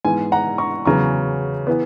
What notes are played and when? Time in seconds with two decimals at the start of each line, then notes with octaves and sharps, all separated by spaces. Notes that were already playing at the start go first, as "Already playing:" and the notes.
0.05 G#2 E3 B3 G#5
0.32 F#5 A#5
0.58 A#5 C#6
0.85 E2 C#3 F#3 B3 A#5 C#6
1.67 E3 B3